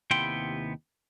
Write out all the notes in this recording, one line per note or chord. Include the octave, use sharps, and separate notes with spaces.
D#2 C3 B3 E4 G5 C6